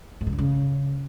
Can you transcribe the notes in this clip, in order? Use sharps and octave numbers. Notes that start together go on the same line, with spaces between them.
G#2
C3
D3
C#3